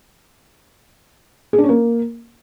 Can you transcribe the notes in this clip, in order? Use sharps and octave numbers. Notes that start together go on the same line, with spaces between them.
G#4
D4
C#4
A#3